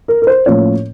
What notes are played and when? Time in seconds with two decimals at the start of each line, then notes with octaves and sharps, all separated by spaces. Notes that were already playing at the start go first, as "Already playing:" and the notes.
0.08 A#4
0.22 A#4
0.27 C5
0.46 A2 F3 A#3 C#4 F4 C#5